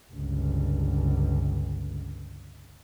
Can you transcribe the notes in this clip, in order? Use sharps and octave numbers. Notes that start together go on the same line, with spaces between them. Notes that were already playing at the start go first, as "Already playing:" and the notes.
G1 C#2